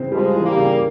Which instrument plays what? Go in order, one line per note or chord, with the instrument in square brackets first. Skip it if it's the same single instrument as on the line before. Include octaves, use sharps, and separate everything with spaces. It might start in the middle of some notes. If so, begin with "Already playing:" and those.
Already playing: [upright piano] C#3 E3 C4
[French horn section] F3 G#3 [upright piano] G3
[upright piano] E3
[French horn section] G3 A#3
[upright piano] C#3